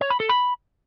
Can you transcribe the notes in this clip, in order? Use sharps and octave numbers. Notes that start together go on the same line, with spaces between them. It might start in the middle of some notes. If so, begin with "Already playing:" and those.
C#5
B5
A4
B5